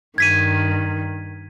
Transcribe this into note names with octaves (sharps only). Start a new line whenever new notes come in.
G2 D#3 G#6 B6 D#7